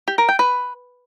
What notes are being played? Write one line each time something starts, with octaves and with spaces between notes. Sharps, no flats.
G4
A#4
G5
B4